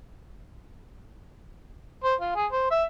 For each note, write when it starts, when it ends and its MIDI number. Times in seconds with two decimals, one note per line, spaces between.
2.04 2.15 72
2.21 2.34 65
2.36 2.46 68
2.52 2.66 72
2.71 2.84 76